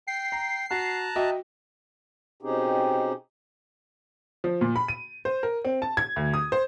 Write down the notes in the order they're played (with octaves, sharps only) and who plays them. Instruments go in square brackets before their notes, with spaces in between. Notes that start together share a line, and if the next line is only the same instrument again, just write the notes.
[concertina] G5 [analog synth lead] C7
[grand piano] A#5
[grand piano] F#4 [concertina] A5 A#5 F#6
[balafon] F#4 [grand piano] D#5 E5 G5
[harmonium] B2 C4 C#4 D#4 G4 G#4
[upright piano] F3
A#2
B5
D#7
C5
A#4
C4
A5
G#6
D2
D#6
C5